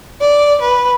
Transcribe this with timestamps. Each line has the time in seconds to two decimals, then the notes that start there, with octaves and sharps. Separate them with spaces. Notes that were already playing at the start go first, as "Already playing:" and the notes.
0.20 D5
0.60 B4